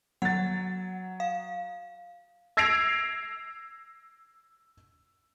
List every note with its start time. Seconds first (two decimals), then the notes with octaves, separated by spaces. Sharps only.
0.22 F#3 F#5 A6
1.20 F5
2.57 E6 G#6 A#6 C7 D7 F7